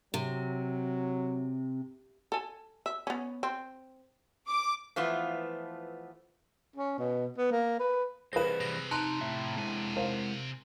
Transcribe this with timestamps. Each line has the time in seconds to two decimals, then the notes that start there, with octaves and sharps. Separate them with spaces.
0.14 C3 F#3
2.32 A4 G#5
2.86 E5
3.07 B3 C#4
3.43 C4
4.48 D6
4.96 E3 F3 A3 B3 F4
6.76 C#4
6.98 B2
7.38 B3
7.51 A#3
7.79 B4
8.33 E3 G3 G#4 B4 C5 A#6 E7
8.61 C3 F3 A#6
8.91 D#4 A5 A#5 C6 F#6
9.21 A2 E5
9.57 C3 G#3 E4 G#5
9.95 A#4 C5 F5